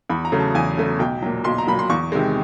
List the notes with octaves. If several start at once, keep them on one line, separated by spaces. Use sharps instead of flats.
E2 B5
A#5
C#3 F#3 A3
A5
E2 G#5
C#3 F#3 A3
B1 G5
A#2 F#3
B1 C6
A#5
A#2 F#3 B5
C6
E2 C#6
C3 D#3 G#3